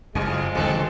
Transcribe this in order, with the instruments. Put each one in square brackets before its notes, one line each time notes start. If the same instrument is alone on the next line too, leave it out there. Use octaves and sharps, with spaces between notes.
[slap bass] F#1 F2 C#3 [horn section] F3 G#3 [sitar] G3
[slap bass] D1 C#2 [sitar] D#3 C4 A4